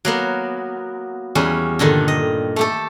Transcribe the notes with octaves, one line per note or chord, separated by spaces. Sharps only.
F#3 A#3 B3
E2 G3 C#4
G2 A#2 D3 D#3
D#5
A3 G4 A4